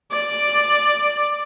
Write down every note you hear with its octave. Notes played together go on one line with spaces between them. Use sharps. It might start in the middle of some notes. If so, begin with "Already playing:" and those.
D5